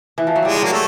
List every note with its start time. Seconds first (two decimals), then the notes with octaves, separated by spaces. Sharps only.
0.18 E3
0.27 F3
0.36 F#3
0.45 G3 G#3
0.56 G3
0.62 F#3 A#3
0.72 A3